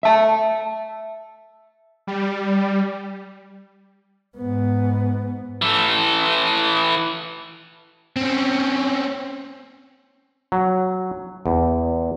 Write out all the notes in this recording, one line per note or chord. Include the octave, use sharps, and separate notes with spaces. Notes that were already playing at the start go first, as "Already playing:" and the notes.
E5 A5
G3
G#2 B3
E3 A4
C4 C#4
F#3
E2